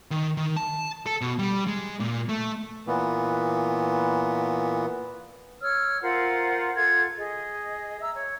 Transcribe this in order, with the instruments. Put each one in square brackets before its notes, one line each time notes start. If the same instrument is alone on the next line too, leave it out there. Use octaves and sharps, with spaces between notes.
[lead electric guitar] D#3
D#3
A5
A4
B2
G3
G#3
A#2
A3
[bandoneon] A#2 E3 B3
[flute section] C#5 E6 F6
F4 A#4 C5 F#5
F4 A4 F#5 G#6
G#4 D#5
E5 A#5 E6
C#5